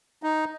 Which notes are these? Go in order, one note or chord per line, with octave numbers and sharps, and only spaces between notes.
D#4